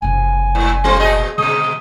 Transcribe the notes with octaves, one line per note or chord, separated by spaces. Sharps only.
F#1 C3 G#5
G#2
G3 C4 F4
A#2 G#4 D#5
B2 D3 D#3 G#3 D#6